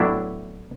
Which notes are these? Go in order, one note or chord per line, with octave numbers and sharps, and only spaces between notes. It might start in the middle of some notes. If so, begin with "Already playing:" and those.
Already playing: A2 F#3 B3 D4 E4